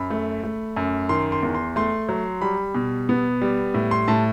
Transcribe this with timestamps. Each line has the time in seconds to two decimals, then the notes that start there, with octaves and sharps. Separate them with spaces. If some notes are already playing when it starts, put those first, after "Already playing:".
Already playing: F#2 B5
0.10 A3
0.44 A3
0.77 F#2
1.09 D#3 C6
1.32 C6
1.43 E2
1.55 C6
1.76 A3 C6
2.09 F#3
2.41 G3 B5
2.75 B2
3.09 B3
3.41 G3
3.74 A2
3.91 C6
4.08 A2 A5